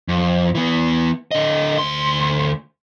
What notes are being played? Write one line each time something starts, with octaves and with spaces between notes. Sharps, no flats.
F2
E3 B3
D3 D#5
D2 C6